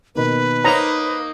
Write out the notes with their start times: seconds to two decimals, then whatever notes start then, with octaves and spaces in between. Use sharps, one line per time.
0.15 B2 D#3 A#3 B4
0.65 A#3 D#4 C5 C#5 A#5